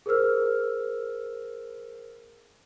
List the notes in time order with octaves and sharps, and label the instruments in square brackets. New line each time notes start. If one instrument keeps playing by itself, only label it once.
[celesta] G#4 A#4 C5 E6 F6